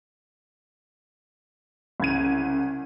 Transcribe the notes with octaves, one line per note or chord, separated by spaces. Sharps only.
C2 C#3 G#6 D#7